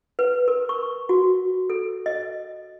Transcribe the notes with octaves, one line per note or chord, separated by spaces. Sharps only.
B4
A#4
C#6
F#4
A4
D#5